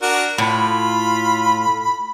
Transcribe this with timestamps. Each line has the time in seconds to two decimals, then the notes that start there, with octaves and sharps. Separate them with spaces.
0.02 D4 F#4 A#4 F#5
0.38 A2 F4 B5